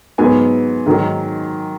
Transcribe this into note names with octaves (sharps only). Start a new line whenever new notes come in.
G#2 F#3 B3 G#5
G#2 D#3 F#3